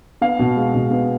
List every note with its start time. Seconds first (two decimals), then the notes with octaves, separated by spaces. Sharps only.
0.21 B3 F5
0.39 B2
0.56 G#3
0.74 B2
0.91 B3